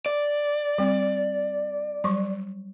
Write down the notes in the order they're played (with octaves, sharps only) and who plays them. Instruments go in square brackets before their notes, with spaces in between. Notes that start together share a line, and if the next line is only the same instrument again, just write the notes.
[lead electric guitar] D5
[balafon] G3 C4
F#3 G3 C#6